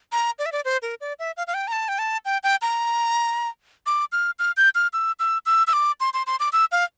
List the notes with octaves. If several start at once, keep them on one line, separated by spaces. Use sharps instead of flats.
A#5
D5
E5
D5
C5
A#4
D5
E5
F5
F5
G5
A#5
A5
G5
A5
G5
G5
A#5
D6
F6
F6
G6
F6
E6
E6
E6
E6
D6
C6
C6
C6
D6
E6
F5